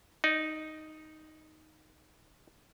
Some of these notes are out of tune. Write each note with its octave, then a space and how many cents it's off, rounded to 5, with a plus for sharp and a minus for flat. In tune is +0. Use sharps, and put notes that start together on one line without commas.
D#4 +0 D5 +35